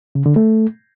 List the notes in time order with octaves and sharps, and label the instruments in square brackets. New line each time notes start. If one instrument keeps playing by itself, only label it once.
[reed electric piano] C#3
D3
A3